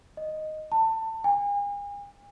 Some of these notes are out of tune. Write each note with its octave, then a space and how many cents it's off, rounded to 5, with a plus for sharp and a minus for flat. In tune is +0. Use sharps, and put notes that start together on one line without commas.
D#5 -5
A5 +20
G#5 -40